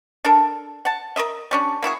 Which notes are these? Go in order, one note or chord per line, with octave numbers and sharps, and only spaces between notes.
D4 A4 A#4
F#5 A5
A#4 B4 D#5 E5
G3 C#4 D4
A#3 E4 F#4 G#4